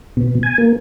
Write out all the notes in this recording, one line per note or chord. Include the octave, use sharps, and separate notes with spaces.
B2
G#5
A#3